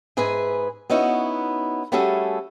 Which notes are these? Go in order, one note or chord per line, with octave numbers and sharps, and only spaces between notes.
G#2 G#4 B4 E5 G#5
B3 C#4 D#4 E4 F#4
G3 A3 C#4 F#4 G#4 A4